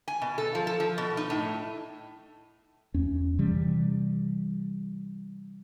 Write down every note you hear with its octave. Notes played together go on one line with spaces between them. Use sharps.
G#5
B2
A4
F3
A4
F3
B2
D#4
A2
E2 C#4
C3 E3 G3